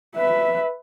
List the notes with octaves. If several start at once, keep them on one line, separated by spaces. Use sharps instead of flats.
B4 E5